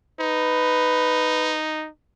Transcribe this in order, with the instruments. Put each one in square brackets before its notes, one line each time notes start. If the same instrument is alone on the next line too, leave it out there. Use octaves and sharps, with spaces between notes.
[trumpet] D#4 [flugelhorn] B4